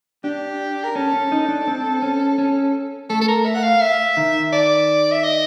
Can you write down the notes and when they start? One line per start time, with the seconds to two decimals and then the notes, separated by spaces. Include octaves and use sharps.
0.24 D4 G4
0.84 A#4
0.95 C#4 A4
1.13 C#4
1.32 D#4
1.48 D4
1.67 C4
2.02 C#4
2.38 C#4
3.10 A3 A4
3.21 A4
3.28 A#4
3.45 E5
3.55 F#5
3.63 F5
3.81 E5
4.17 D#3
4.53 D5
5.12 E5
5.24 D#5